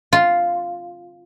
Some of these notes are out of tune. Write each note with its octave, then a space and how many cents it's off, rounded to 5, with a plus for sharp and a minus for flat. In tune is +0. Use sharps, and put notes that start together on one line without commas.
F4 +0